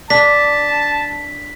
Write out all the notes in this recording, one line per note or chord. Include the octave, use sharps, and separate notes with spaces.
D4 A5 B6